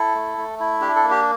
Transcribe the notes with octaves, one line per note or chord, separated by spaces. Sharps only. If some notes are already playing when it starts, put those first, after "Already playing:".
Already playing: E4 A4
A3
A3
E4
D4 G4
A4
A#3
G4